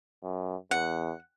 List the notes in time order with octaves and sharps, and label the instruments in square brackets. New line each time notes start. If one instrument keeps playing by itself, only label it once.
[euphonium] F#2
[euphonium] E2 [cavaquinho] F#5